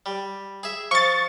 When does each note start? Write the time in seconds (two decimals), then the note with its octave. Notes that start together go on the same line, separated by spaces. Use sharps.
0.06 G3
0.63 G#4 E5
0.91 F3 C#6 A6